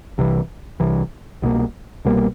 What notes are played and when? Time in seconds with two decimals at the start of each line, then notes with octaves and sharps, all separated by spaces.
0.18 C2 C3 E3
0.80 C2 C3 E3
1.42 C2 B2 G3 A#3
2.05 C2 B2 G3 A#3